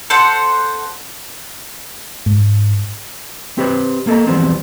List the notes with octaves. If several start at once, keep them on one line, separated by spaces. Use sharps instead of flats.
A4 C5 F#5
G#2
C4 G4 B4 C5
A#3 A4 D#5 A#5
E3 F3 G3 G#3 B3 C4